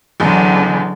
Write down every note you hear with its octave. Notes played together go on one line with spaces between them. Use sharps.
A1 E2 D3 F#3